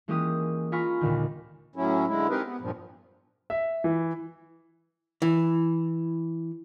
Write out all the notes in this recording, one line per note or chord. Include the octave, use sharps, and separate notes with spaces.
E3 G#3 A#3 C#4 G4 D#6
F4 G#5 A#5 B5 C#6 F6
D#2 A#2 D3 D#3
A2 F#3 C#4 E4
D3 G#3 E4
C4 D#4 G4 G#4 A#4 B4
B3
G2 A#2 F3
E5
E3
E3